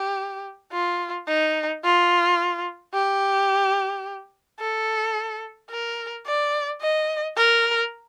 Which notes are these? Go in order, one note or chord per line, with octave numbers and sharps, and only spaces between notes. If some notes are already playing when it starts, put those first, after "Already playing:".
Already playing: G4
F4
D#4
F4
G4
A4
A#4
D5
D#5
A#4